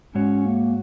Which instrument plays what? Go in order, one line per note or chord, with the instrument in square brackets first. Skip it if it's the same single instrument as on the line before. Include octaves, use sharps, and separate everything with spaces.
[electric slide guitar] G#2 G#3 F#4 C#5 [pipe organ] C#4
[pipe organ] A#3